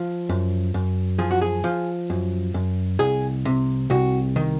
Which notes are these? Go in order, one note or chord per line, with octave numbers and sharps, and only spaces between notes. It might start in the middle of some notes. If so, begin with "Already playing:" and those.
Already playing: F3
F#2
F#2
F3 G#4
F#4
G#4
F3
F#2
F#2
C2 G#4
C3
C2 F#4
D#3